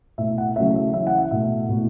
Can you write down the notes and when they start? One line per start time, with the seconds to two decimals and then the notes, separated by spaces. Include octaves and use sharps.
0.18 B2 A3 E4 E5
0.38 F#5
0.56 C#3 F#3 A3 C#4 E4 E5
0.75 E5
0.93 E3 C#4 E4 E5
1.07 F#5
1.18 E5
1.31 B2 A3 E4 E5
1.69 B2 A3 E4